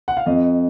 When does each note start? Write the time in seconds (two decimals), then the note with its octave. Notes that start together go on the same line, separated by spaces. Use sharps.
0.08 F#5
0.17 F5
0.26 F2 D#5